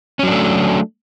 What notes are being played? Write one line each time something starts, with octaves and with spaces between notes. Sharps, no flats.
F#3 A3 C#4 D4